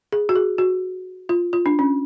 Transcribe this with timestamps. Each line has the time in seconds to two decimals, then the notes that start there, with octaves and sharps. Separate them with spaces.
0.12 G#4
0.29 F#4
0.36 G#4
0.58 F#4
1.29 F4
1.53 F4
1.66 D4
1.79 C#4